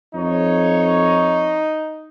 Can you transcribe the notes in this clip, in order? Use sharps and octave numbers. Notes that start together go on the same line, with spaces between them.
F2 D#4 C#5